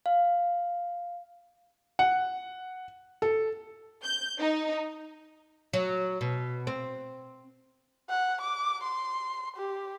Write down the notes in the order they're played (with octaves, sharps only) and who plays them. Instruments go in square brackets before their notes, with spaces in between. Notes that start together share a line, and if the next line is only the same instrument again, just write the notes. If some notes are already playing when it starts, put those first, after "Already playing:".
[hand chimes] F5
[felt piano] F#5
A4
[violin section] G6
D#4
[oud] F#3
B2
C4
[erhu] F#5
D6
C6
G4